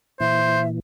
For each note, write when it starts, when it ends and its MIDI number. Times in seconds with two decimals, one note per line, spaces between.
0.20 0.80 46
0.20 0.80 52
0.20 0.61 72
0.20 0.68 76